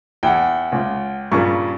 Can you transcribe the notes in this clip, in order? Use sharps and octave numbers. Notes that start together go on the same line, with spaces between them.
E2 F#5 G5
C#2
G2 A#2 C#3 C#6